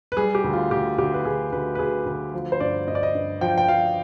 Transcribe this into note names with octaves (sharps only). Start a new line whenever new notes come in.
B4
G3 G#4
G4
D2
F4
D2 G4
D2 G4
B4
D2 G#4
D2 B4
B4
D2 G#4
D2 B4
F3
C5
G2 D5
G2 D#5
D5
D#5
G2
F3 G5
G5
F3 F5